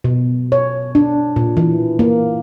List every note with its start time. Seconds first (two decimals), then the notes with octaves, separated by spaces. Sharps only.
0.04 B2
0.52 C#5
0.95 D4
1.36 A#2
1.57 E3
1.99 A#3